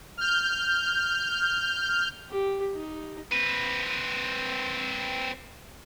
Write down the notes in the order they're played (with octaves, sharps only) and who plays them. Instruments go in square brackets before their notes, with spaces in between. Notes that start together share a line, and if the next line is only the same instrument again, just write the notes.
[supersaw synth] F6 G6
[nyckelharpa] G4
D#4
[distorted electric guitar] C4 B4